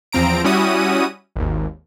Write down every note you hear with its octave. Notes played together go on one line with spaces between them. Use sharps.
E2 F3 C4 A#5 D7
G3 C#4 E4 F#4 D#6 D#7
G#1 D#2